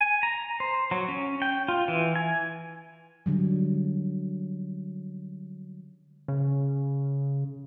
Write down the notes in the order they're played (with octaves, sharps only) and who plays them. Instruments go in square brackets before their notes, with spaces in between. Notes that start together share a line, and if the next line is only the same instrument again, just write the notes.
[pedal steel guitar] G#5
A#5
C5
F#3
C#4
G5
F4
E3
G#5
[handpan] D3 F#3 G3
[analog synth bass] C#3